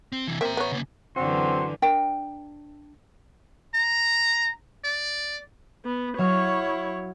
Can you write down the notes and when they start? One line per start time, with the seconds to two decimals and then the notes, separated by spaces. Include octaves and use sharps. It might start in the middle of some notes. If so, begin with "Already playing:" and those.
0.12 C4
0.27 C3 E3
0.41 A#3 C4 E5 A#5
0.57 B3 C#5
0.72 C#3 A#3
1.16 F#2 D3 E3 C4 F#4 C6
1.82 D4 A#4 G5
3.74 A#5
4.85 D5
5.85 B3
6.18 F#3 E4 C#5 F5 C#6